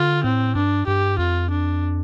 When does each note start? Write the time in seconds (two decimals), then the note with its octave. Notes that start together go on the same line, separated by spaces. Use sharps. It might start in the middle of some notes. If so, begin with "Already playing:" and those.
Already playing: D3 F4
0.24 A2 C4
0.56 G2 D4
0.87 G2 G4
1.19 F2 F4
1.51 D4